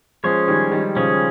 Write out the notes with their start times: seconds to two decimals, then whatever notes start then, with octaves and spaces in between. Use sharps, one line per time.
0.24 F3 G#3 C#4 G#4 C#5
0.48 D#3 G3
0.72 D#3 G3
0.96 C#3 F3 C#4 G#4 C#5